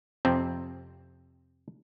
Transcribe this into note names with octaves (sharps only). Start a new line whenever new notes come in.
F2 C3 C4